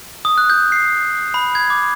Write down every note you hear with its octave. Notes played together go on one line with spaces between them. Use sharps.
D#6
F#6
G6
C7
B5
G#6
D6